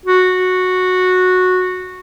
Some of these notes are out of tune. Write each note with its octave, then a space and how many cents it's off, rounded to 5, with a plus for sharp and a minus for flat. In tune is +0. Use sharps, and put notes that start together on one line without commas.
F#4 -10